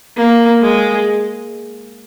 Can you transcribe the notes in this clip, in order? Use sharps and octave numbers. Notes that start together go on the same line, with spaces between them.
A#3
G#3